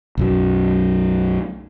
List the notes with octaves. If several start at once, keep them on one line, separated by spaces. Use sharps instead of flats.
B1 F#2 F#3